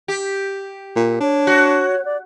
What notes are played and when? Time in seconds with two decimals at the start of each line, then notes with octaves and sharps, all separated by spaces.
0.08 G4
0.96 A#2
1.21 D4 C#5
1.47 F#4
2.05 D5